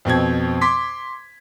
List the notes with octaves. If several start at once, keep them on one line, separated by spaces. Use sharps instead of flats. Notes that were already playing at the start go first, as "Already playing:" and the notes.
F2 B2 C4 G#6
C6 D6 B6